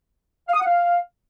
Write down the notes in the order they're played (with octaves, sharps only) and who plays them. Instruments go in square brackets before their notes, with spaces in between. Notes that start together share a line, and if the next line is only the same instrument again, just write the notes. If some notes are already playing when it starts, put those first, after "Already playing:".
[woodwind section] F5
D#6
F#5
F5